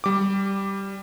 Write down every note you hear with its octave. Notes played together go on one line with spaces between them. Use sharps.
G3 D6